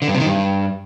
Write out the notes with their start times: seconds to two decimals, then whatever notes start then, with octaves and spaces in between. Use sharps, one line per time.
0.02 D3
0.08 G2
0.14 C3
0.20 D#3
0.26 G2